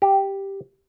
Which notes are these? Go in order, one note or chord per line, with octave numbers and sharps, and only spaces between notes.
G4